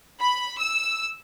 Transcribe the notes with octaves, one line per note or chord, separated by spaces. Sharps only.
B5
E6